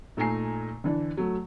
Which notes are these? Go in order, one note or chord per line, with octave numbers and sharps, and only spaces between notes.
A#2 A3 D#4 G#5 A#5 C7
D3 E3 D4
F#3 A3